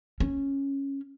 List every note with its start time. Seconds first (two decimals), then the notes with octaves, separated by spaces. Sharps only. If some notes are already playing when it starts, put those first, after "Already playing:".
0.20 C#4